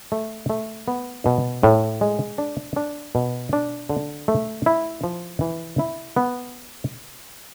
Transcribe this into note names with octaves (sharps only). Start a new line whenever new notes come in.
A3
A3
B3
B2
A2
G#3
D4
D4
B2
D4
D3
A3
E4
F3
E3
E4
B3